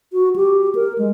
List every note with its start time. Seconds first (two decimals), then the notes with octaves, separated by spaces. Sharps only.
0.13 F#4
0.36 G4
0.75 A#4
0.98 G#3